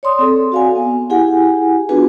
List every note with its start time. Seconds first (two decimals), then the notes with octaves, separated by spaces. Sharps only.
0.03 C#5 D5 C6 D#6
0.19 C4 G#4 A4
0.52 F#4 D5 F5 F#5 G#5
0.76 B3
1.10 E4 G4 G#4 F#5 G#5
1.89 B3 D4 F4 F#4 G#4 B4